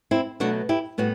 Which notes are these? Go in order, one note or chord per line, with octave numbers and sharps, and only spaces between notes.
C4 E4
B2 F#3 A3 D4 F#4
E4 G4
A2 G3 B3 F#4